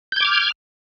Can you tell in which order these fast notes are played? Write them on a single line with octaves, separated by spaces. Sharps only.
G6 G#6 D6 F6